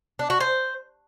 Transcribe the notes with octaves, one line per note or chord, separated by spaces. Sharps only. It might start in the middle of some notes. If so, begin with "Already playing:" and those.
D4
F#4
C5